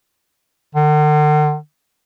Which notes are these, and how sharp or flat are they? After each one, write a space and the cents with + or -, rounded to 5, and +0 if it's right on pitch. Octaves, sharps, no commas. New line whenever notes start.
D3 +45